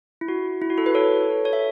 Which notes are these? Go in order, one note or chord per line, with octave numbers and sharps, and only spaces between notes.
E4
F#4
E4
F#4
E4 A4
F#4 B4
A4 C#5
C#5
E5